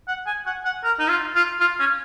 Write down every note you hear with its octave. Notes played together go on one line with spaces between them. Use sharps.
F#5
G#5
F#5
F#5
A#4
D#4
F4
F4
F4
C#4